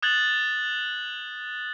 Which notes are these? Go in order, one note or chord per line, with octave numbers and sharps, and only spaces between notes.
D#6 F#6 G#6 A6 F#7